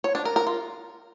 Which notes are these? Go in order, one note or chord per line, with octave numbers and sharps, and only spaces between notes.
C#5
D4
A#4
A#4
F4